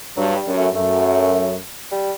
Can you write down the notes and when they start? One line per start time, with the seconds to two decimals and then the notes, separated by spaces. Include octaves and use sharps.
0.17 G2 F#3
0.32 F#3
0.36 G3
0.47 F#2
0.57 A3
0.75 F#2 A3
1.92 G3